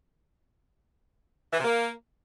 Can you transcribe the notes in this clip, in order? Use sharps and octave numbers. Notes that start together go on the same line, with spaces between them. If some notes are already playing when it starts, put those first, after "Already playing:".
E3
C3
A#3